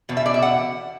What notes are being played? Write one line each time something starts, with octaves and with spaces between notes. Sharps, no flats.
E2 B2
E5
D5
E5
F#5